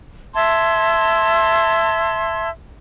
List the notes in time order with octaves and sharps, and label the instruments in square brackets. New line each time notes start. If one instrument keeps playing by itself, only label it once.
[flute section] E5 A5 C6 G#6